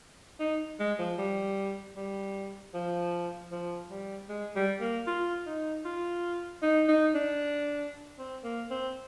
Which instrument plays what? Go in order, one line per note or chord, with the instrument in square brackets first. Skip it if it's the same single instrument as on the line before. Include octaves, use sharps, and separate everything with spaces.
[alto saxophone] D#4
G#3
F3
G3
G3
F3
F3
G3
G#3
G3
A#3
F4
D#4
F4
D#4
D#4
D4
C4
A#3
C4